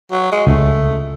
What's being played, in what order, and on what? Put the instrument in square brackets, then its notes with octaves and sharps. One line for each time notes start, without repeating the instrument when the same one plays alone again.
[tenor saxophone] F#3
G#3
[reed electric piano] C#2 [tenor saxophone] A3